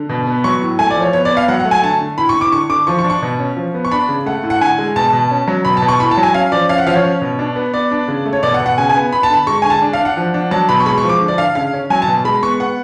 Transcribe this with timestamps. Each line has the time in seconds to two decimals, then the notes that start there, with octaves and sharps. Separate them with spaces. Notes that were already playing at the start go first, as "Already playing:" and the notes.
Already playing: D3
0.09 B2
0.27 B3
0.44 F#3 C#6
0.62 A2
0.79 A3 G#5
0.90 D5
0.96 F3
1.02 C#5
1.13 B3 C#5
1.25 D5
1.31 B3
1.37 F5
1.48 F#3 F#5
1.60 F#5
1.65 A3
1.71 G#5
1.83 D3 A5
2.01 D3
2.18 A2 B5
2.29 C#6
2.35 A2
2.41 D6
2.52 D3 C#6
2.70 D3 D6
2.87 F3 C#6
2.99 C#6
3.04 D4
3.10 C#6
3.22 B2
3.39 C#4
3.57 F3
3.74 B3
3.85 C#6
3.91 D4 B5
4.09 C#3
4.26 A3 F#5
4.43 A2
4.50 F#5
4.61 D3 G#5
4.79 G#3
4.96 B2 A5
5.13 B2
5.31 C#4
5.48 F#3
5.65 B2 B5
5.77 A5
5.82 B2
5.88 C#6
6.00 A2 B5
6.11 A5
6.18 F#3
6.23 G#5
6.34 C#4 F5
6.52 F3 D5
6.69 C#4 F5
6.78 F#5
6.87 F3 F5
6.95 C#5
7.04 C#4
7.22 B2
7.39 D4
7.56 B3
7.74 B3 D5
7.91 D4
8.08 C#3
8.26 A3
8.33 C#5
8.43 B2 D5
8.54 F#5
8.61 B2
8.66 F#5
8.78 C#3 G#5
8.89 G#5
8.95 B3
9.13 B3 B5
9.23 A5
9.29 D3 B5
9.47 G#3 C#6
9.62 D3 G#5
9.70 A5
9.82 D4
9.93 F5
9.99 D4
10.05 F#5
10.17 F3
10.34 D4
10.51 F#3 A5
10.69 B2 B5
10.80 C#6
10.86 G#3 B5
10.98 C#6
11.03 F3
11.09 D6
11.21 D3
11.28 D5
11.38 D3 F5
11.55 C#3 F5
11.73 C#4
11.90 F#3 G#5
12.02 A5
12.08 B2
12.25 G#3 B5
12.43 B3 C#6
12.60 B3 F#5